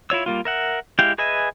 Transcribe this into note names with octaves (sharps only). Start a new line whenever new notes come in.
E4 F4 C#5 E6
G3 A#3 F4
A#4 E5 F#5
G#3 E4 G4 F5 G5
G#4 B4 D#5 E5 G#5